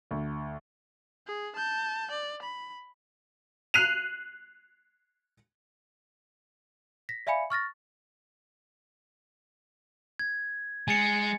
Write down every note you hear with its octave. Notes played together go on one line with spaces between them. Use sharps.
D2
G#4
A5 G6
D5
B5
F#6 C7 D#7 F7
A#6 B6
D5 E5 F5 G#5 B5 C#7
C#6 F6 A6 A#6
G#6
G#3 G#5 A6 C#7